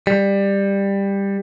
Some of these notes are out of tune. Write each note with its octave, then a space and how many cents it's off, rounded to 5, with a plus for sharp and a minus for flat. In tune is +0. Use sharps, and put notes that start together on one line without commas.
G3 +15